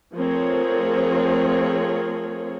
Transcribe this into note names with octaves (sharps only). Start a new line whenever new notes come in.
F3 A3 C4 G#4 A#4 C#5